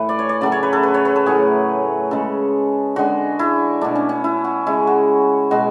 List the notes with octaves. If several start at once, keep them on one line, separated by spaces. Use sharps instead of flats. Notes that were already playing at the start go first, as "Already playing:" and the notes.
Already playing: A2 E3 A3 B4
D5
C#5
D5
C#3 F#3 A3 D5
C#5
B4
A4
B4
C#5
B4
A4
A2 F#3 A3 G#4
C#3 G#3 A4
D3 G#3 F#4
E4
B2 A3 D4
C#4
C#4
E4
F#4
C#3 G#3 E4
F#4
B2 G#3 F#4